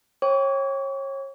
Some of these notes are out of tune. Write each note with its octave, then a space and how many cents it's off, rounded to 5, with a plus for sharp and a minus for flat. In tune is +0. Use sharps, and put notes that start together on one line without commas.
C#5 -30 G5 +0 C#6 +45